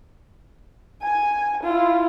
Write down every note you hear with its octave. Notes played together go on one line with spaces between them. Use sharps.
G#5
E4 F4